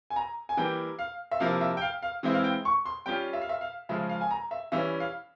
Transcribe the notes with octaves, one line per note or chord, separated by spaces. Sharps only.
G#5
A#5
G#5
E3 G3 A#3 G5
F5
E5
C3 F3 A#3 E4 F5
E5
G5
F5
F5
E3 G#3 C4 E4
F5
G5
C#6
C6
G3 C#4 F4 G5
E5
F5
E5
F5
C#3 F3 G#3 E5
F5
G#5
A#5
E5
E3 G3 C#4 E5
F5